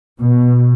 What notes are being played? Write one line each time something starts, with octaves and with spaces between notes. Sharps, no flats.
B2